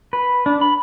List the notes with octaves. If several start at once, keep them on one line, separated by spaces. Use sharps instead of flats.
B4
D4
B5